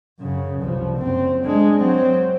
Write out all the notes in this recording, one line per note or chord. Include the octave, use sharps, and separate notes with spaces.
F#2 C#3
C2 F3
F#1 C4
G#3 D4
F#3 C4